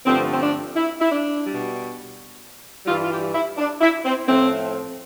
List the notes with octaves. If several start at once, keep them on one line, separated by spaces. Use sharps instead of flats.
G2 D3 F3 A3 C4
C4
D4
E4
E4
D4
B2 G3
G2 E3 G3 F4
F4
G4
E4
D4
E4
C4
A2 F3 A3 C4